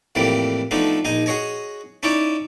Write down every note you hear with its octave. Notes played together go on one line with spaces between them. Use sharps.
F2 A2 E3 G3 A#3
F3 A3 B3 D4 D#4
A#1 D#4 D#5 G#5
F#4 G#4 C#5 D#5 G#5
C#4 D#4 E4 C#5 D5